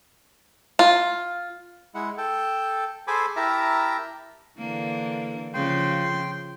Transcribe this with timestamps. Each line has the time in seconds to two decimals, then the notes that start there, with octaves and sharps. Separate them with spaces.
0.79 F4
1.95 G#3 E4 F#5
2.18 A4 G5
3.07 G#4 A4 C5 G#5 B5 D6
3.36 E4 G4 A#4 E5 A5 A#5
4.58 D3 E3 A#3
5.54 C#3 F3 G5 C6